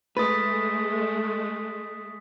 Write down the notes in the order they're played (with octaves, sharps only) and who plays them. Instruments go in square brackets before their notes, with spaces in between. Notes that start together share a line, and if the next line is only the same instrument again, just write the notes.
[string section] G#3 A3 [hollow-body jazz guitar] B4 [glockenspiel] D#6 A6 B6